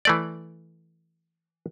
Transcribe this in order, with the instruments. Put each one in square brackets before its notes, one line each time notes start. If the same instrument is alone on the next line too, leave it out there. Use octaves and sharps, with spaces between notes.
[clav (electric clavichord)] E3 A3 D5